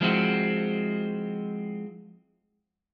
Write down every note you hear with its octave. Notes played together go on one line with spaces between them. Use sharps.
F3 G#3 C4 E4 F#4